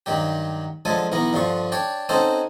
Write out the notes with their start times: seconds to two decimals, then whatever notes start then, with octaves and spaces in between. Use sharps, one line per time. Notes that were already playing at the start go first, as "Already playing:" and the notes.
0.06 G2 D#3 F#3 G4
0.85 D3 F3 F#3 G#3 A4 G#5
1.12 B1 E3 B3 A#4
1.33 G2 D3 F3 C6 C#6
1.72 D4 C#5 D5 G5
2.09 C4 C#4 D#4 F#4 A4 C5